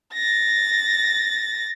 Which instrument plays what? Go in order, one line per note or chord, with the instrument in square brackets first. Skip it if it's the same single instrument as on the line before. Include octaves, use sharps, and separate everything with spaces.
[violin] A6 A#6